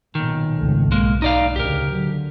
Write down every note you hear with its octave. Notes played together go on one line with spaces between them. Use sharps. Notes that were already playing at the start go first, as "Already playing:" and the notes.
B1 A#2 D#3
G#1 C#2 A3
B1 G#3 A#3
D#4 D5 F5
D2 A#2 C#3 G4 A#4
D3 F#3